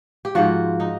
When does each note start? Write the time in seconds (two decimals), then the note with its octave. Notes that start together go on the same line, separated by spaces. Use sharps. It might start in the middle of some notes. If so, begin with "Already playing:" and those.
0.25 G4
0.35 G#2 F3 F#4
0.80 D#4